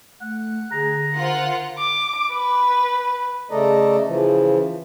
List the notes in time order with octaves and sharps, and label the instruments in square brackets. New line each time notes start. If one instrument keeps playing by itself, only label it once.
[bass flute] A3 [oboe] F#5
[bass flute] D3 [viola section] G#4 [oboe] A#5
[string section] F4 F#5 [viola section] A#4 C5
[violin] D6
B4
[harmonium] C#3 A3 A4 D5 D#5 A#5
C#3 E3 F3